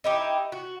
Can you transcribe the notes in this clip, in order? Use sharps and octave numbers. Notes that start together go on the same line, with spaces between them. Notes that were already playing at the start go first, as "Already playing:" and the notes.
D#4 E4 G4
F#4